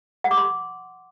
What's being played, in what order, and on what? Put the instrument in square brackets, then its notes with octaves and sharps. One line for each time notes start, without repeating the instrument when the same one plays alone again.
[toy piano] F#5
D6
C6